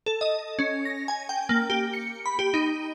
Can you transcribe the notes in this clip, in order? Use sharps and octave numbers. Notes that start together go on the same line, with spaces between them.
A4
D#5
C#4
A#6
G#5
G5
A#3
G4
C#7
B5
G4
D#4